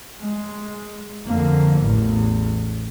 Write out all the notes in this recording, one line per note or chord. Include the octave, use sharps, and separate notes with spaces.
G#3
F2 D3 A#3
A1 E2